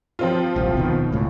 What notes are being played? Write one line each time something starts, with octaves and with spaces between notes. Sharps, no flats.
F3 C4 F4
D#1 C2
D1 B2 D#3
C#2 A2